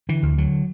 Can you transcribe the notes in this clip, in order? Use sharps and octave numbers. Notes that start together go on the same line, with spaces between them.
D3 E3
D2
D3 F#3